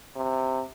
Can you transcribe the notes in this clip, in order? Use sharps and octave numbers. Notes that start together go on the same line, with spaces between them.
C3